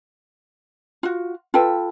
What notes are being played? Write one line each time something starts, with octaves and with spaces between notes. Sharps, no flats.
F4 F#4
F4 A4 B4 G5